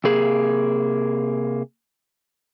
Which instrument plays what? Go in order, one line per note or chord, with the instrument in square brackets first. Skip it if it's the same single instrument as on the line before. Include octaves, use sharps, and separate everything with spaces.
[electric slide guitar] C3 A#3 G#4